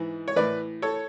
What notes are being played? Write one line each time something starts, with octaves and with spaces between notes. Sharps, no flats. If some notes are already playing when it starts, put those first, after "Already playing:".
Already playing: G#2 E3
C#5
A2 E3 B4 D5
A4 C#5